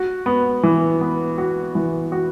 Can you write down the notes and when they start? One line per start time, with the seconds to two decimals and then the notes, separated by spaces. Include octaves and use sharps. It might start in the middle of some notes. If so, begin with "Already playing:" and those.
Already playing: F#4
0.26 B3
0.63 E3
1.01 B3
1.38 F#4
1.75 E3
2.12 F#4